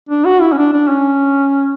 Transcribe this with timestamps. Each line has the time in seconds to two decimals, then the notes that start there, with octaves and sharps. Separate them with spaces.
0.09 D4
0.25 F#4
0.41 E4
0.52 C#4
0.58 D4
0.73 D4
0.88 C#4